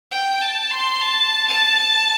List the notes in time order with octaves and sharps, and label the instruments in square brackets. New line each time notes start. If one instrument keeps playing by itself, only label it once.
[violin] G5
A5
C6
A5
A5